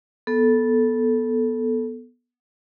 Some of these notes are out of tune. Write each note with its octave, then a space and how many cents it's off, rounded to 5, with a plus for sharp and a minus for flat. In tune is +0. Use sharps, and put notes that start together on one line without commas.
B3 -15 A4 -5